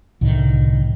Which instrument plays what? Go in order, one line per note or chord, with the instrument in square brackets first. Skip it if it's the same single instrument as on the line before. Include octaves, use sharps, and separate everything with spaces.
[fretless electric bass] C2 A2 D3 D#3